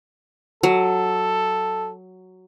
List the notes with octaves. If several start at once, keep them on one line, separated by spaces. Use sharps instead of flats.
F#3 A4